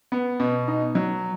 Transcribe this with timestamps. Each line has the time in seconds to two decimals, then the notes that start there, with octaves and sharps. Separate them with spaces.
0.12 B3
0.40 B2
0.68 D#4
0.95 F#3